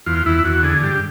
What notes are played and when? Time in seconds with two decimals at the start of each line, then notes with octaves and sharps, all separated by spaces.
0.06 E2 F4
0.26 E2 E4
0.44 E2 F#4
0.63 D3 G#4
0.83 G2 G4